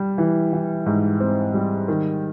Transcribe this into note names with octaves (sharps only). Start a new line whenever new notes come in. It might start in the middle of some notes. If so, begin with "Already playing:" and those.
Already playing: G3
E3
E3
G#2
C4
G3
D#3